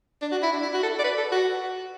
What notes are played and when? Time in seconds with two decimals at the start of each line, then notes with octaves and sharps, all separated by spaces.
0.22 D4
0.32 F#4
0.43 E4
0.52 D4
0.63 E4
0.74 F#4
0.83 A4
0.99 D5
1.04 B4
1.18 A4
1.32 F#4